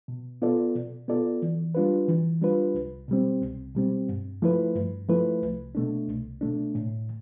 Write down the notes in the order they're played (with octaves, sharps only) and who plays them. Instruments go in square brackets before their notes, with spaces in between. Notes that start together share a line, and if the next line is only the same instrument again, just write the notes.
[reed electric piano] B2
B3 F4 A4 D5
B2
B3 F4 A4 D5
E3
G3 D4 F4 B4
E3
G3 D4 F4 B4
C2
B2 G3 C4
C2
B2 G3 C4
G2
F3 A3 E4 B4
G2
F3 A3 E4 B4
C2
B2 A3 D4
C2
B2 A3 D4
A2